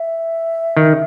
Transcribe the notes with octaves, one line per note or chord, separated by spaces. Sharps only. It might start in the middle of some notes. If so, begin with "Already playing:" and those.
Already playing: E5
D#3